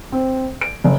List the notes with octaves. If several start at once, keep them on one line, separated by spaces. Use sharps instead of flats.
C4
D7
F#1